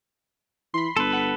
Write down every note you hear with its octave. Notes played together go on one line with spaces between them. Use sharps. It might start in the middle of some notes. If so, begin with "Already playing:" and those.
E3 B5 C6
G1 A4 B4
F#5 B5